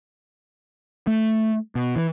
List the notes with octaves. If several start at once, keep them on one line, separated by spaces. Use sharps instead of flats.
A3
B2
E3